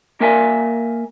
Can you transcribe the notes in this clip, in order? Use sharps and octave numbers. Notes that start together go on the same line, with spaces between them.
A#3 A#4 E5 F5 G#5